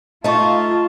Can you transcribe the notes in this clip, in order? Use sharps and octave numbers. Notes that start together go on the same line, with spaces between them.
A3 D#4 F4 D#5 A5 C#6